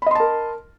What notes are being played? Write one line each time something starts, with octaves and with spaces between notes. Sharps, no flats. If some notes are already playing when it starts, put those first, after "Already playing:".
A#4 D#5 A5 B5 C6